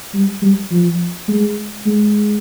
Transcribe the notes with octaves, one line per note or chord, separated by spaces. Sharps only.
G3
G3
F3
G#3
G#3